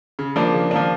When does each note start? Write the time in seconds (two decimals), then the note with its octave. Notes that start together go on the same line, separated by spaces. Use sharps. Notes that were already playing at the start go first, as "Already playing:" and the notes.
0.19 C#3
0.36 F3 A#3 D4
0.54 C#3
0.71 F3 A#3 D4